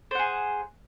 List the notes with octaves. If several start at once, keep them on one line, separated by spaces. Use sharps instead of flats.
G#4 C5 F#5